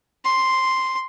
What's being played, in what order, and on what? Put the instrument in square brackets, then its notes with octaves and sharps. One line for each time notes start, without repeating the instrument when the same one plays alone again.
[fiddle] C6